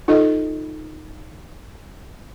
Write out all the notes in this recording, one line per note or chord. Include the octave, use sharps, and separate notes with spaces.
D#4 F4 A4 D#5